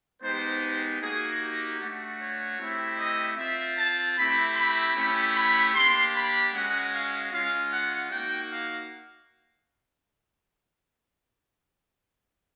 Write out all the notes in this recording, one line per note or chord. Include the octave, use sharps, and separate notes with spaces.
G#3 B3 D#4 G4 C5
A#3 D#4 F#4 G#4
G4
A3 D4 F#4
C#5
A3 C4 E4 G4
D#5
C4 F4 E5
A5
A3 C4 E4 G4 B5
B5
A3 C#4 E4 G4
B5
A#3 D4 G4 C6
B5
G#3 C#4 F#4 F#5
F5
G#3 C#4 F4 F5
F#5
A#3 D#4 F#4 G5
F5